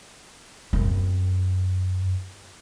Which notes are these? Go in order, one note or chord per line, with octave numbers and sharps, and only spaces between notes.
F#2 C4